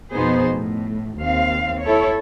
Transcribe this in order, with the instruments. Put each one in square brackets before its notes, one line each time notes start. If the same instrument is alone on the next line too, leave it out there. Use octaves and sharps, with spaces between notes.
[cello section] F2 B2 B3 D#4 G#4 C5
A2
D#2 C4 F5
E4 A4 C#5